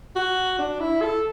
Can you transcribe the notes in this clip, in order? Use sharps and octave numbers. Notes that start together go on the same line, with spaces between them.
F#4
D4
E4
A4